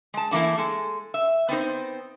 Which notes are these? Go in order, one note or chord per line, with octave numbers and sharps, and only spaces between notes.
G#3 A5
D3 E3 A3 A#3 E4
G#3 A4
E5
B3 C4 D#4 C5